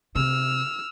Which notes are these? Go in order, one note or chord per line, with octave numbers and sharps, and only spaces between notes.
C3 E6 F6